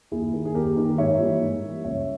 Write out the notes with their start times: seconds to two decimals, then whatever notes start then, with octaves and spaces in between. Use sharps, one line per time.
0.11 D#2 E4 G#4
0.33 D#3 A#3
0.45 G#4
0.54 D#2 G4 A#4
0.76 D#3 A#3
0.98 G#2 C#5 E5
1.19 E3 G3 A#3
1.41 G#2
1.63 E3 G3 A#3
1.84 C#2 C#5 E5